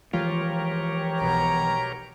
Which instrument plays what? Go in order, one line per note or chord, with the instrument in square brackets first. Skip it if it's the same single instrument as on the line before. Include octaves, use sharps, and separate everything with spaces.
[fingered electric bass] E3 F3 G#3 [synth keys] F4 [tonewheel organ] G4 A#4 C#5
[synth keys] B1 B2 [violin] A#5